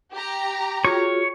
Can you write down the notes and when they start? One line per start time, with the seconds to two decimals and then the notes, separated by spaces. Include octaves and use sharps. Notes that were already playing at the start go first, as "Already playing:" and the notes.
0.14 G4 A#5
0.85 F4 F#4 G#4 C#5